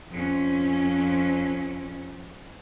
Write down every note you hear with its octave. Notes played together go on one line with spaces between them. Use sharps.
F2 C#4